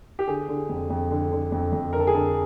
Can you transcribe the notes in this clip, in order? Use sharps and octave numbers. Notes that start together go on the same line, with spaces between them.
G4
D3 G#4
D3
F2
F2
D3
D3
F2
F2
D3 A#4
A4
G#4
D3 A4